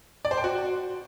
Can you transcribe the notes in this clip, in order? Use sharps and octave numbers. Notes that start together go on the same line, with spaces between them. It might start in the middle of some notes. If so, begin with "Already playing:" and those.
D5
C5
G5
F#4